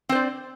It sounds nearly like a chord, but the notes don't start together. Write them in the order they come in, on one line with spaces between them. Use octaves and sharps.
C4 C5 D5